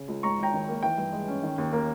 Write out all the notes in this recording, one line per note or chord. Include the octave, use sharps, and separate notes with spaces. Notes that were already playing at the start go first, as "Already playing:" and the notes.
Already playing: C#3
C#2
G#2 A#5 C#6
G#1 G5 A#5
D#3
A#3
E3 G5
G2
G#3
C#4
D#3
D#2
A#3